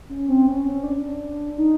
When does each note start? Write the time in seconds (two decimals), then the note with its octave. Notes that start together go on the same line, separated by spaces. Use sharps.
0.09 C#4
0.28 C4
0.47 C#4
0.65 C#4
0.83 D4
1.57 D#4